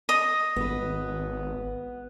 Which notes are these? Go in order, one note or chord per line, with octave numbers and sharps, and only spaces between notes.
D#5
G#1 B3 B4